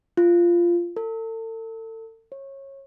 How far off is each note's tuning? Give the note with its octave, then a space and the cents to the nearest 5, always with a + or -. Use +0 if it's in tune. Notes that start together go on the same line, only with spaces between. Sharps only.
F4 -10
A4 +40
C#5 -20